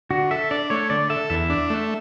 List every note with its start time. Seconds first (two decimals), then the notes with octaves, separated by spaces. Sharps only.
0.10 D3 F#4
0.31 A4 E5
0.51 D4 D5
0.70 A3 C#5
0.90 D3 D5
1.10 A4 E5
1.30 E2 E5
1.50 D4
1.70 A3